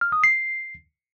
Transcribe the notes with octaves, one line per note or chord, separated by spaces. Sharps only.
F6
D#6
C7